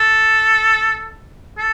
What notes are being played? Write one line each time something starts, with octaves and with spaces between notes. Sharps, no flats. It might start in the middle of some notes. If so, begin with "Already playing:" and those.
Already playing: A4
A4